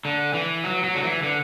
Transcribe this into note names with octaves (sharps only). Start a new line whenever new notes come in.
D3
E3
F#3
F#3
D3
E3
D3